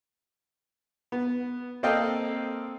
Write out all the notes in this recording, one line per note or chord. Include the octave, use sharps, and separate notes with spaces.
B3
A#3 C4 A4 D#5 F5 G5